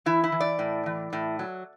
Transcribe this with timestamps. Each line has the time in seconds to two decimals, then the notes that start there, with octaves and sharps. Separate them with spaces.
0.06 E3 E4
0.24 E4
0.32 E3
0.40 D5
0.59 A2
0.86 E3
1.13 A2
1.39 F#3